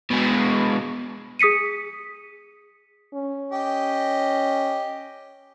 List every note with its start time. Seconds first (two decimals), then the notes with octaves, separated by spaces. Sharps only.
0.10 B2 G#3
1.39 G#4 D#6 B6 C#7 D#7
3.14 C#4
3.52 G4 D#5